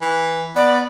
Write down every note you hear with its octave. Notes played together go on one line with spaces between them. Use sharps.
E3
B3 D5